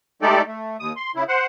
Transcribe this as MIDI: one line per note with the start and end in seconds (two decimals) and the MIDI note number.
0.22 0.42 56
0.22 0.42 57
0.22 0.42 63
0.22 0.42 67
0.22 0.42 69
0.22 0.42 74
0.47 0.77 57
0.80 0.92 39
0.80 0.92 87
0.96 1.11 84
1.15 1.24 49
1.15 1.24 64
1.28 1.46 72
1.28 1.46 78